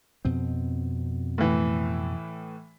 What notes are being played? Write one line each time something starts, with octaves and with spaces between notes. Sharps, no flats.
F2 B2 C4
A2 E3